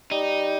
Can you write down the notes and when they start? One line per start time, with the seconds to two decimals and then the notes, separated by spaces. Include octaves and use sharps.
0.11 G3 D#4